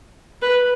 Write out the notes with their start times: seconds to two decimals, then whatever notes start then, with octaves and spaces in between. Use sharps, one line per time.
0.42 B4